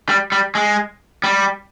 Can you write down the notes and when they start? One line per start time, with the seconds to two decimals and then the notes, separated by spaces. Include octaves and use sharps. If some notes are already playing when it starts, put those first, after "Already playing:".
0.09 G3
0.32 G3
0.55 G#3
1.24 G3